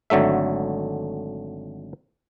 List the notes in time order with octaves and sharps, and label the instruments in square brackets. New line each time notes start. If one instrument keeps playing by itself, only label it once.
[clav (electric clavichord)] G#1 D3 F#3 A3 E5